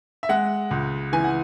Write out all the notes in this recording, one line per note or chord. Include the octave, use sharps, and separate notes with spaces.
E5
G#3 F#5
C#2
E3 G#5
F#5